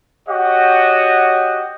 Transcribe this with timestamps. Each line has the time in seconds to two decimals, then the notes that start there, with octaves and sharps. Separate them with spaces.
0.28 F#4 G4 C#5 D#5 F#5